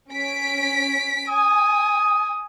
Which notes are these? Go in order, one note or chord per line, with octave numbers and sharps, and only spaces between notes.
C#4 B6 D7
G#5 D#6